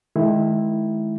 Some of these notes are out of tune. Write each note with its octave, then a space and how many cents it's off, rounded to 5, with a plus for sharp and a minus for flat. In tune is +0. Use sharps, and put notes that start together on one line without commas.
D#3 +0 G#3 +35 E4 +0